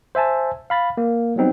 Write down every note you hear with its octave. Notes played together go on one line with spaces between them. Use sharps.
C5 E5 G#5 A5
F5 B5 A6
A#3
F#3 G3 B3 C4 D#4